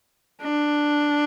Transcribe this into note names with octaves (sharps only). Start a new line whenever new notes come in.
D4